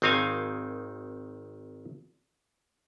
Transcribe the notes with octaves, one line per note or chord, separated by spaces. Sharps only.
G#1 D#3 C4 D#4 F5 G#5